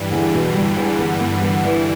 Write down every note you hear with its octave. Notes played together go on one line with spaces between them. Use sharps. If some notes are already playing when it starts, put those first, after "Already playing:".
Already playing: G2 E3 G3
E2 D3
B2
G3
E2
B3
B3
B3
E3